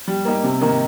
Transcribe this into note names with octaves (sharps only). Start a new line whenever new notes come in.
G3
A#3 D#4 G4
C3
D#3 A#3 D#4